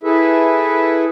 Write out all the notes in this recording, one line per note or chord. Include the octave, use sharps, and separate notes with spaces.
E4 G#4 A4 B4 E5